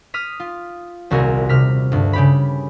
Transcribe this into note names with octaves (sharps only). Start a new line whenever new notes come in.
D#6 F6 B6
F4
D#1 C2 F#4 G#4 A#4
C3 F6 B6
D2 G2
C#3 G4 B5